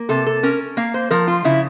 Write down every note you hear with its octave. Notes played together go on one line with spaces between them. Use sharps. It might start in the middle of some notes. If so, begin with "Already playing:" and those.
Already playing: A#3
C3 A4
A4
C#4 A#4
A#3 F5
C5
F3 A#4
F4
C#3 E4